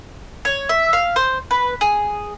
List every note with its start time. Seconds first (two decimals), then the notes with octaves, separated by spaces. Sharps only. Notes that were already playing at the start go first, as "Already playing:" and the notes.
0.45 C#5
0.69 E5
0.93 F5
1.16 C5
1.51 B4
1.81 G#4